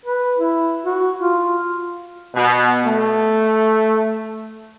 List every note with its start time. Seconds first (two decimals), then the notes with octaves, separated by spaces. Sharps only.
0.06 B4
0.38 E4
0.86 F#4
1.18 F4
2.35 B2
2.85 A3